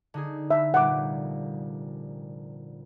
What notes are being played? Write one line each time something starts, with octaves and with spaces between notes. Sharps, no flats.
D3 D#4 G#4
E5
F1 A#2 G3 F#5 D6